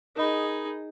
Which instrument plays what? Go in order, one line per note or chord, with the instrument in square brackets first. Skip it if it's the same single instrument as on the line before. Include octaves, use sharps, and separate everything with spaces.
[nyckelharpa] D#4 G#4 [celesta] A#4 D#5 B5